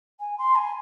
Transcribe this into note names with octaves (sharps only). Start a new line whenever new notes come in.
G#5
C6
G#5